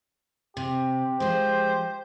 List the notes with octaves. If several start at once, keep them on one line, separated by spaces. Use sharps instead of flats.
C3 G4
F3 G#3 C5